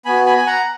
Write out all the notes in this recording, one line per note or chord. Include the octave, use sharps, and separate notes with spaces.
B3 F#4 G#5 B5
G#5 B5
G#5
F#5 A#5